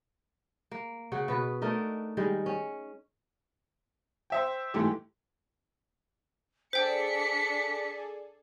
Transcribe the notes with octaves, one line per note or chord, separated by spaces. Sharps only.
A#3
C#3 F#4 F#5
B2 B3 B4
A3 D4 D#4 A#4
D#3 G3 G#3
C#4
C5 E5 G5
G#2 E3 A3 G4
D4 G#4 A4 C5 D5 G5 B6 C#7